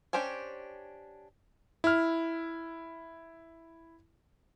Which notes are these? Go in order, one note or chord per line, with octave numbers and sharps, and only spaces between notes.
C#4 D4 G4 C5 G#5
E4 F6